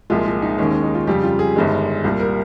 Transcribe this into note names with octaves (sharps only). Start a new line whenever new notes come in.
C2 A#2 F3 G#3 F4
F4
D#4
D#2 D#3 G#3 C#4
C#4
D#4
F4
F2 C#3 G3 G4
F4
G#4
G1 G2 D#3 G#3
C2 A#2 G3
A#4